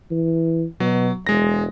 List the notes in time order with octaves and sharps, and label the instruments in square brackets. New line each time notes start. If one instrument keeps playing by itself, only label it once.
[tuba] E3
[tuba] B2 [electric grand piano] F#3
[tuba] E1 [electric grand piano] G#3 A#6